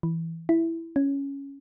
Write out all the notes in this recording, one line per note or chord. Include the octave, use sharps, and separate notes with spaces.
E3
E4
C#4